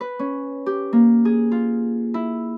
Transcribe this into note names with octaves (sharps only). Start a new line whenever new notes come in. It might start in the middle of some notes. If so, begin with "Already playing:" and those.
B4
C#4
G4
A#3
G#4
F4
E4